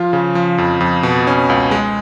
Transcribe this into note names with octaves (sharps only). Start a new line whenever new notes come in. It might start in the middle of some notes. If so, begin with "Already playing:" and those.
Already playing: F3 F4
C#3
F3
F2
F2
B2
C#4
C#2
G#3